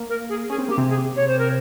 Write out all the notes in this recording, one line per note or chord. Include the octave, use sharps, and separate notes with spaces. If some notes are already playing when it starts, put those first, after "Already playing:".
Already playing: A#3
A#4
G#4
C#4 G#4
C4
A#3 G4
C3 C4
G#4
C#5
C5
A#4